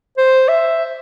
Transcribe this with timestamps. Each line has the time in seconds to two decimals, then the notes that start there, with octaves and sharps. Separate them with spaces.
0.18 C5
0.48 E5